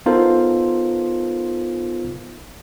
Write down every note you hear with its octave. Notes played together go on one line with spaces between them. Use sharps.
B3 D#4 F4 A4 A#4 C5